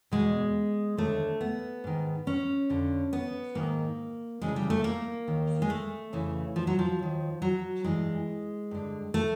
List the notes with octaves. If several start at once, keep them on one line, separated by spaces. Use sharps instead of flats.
E2 B2 G#3
D#2 D3 A3
B3
G#2 D#3
C#4
F2 D3
B3
G#2 D#3 A#3
D2 C#3 E3 G#3
G3
A3
A#3
D#2 D#3
G#3
A3
F2 C#3 E3
F3
F#3
F3
D#2 D#3
F#3
G2 E3 G#3
G2 D3
A3